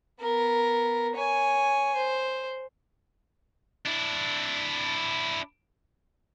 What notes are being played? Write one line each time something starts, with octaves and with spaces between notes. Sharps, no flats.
B3 A#4
C#5 G#5
C5
D4 E4